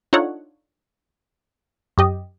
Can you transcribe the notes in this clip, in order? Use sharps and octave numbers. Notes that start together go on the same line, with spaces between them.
D4 D#4 F4 A4 C#5 F#5
F#2 G4 D#5